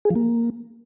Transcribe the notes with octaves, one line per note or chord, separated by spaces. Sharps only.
G#4
F3
A#3